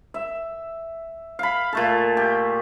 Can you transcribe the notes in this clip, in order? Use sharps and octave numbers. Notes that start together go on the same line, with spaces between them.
E5
F5 B5
A#2 A3 A4
G4